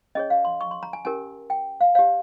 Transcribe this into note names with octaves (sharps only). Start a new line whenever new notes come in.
C#4 G#4 C#5 D#5
F5
C6
C#6
C6
A#5
G#5
C#4 G4 A#4 G#5
G5
F5
G4 C#5 F5